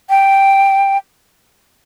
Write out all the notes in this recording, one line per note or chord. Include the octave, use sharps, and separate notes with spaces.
G5